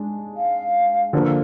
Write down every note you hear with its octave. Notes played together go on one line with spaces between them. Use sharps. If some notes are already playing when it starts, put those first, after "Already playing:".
Already playing: G#3 D4
F5
D3 F3 A#3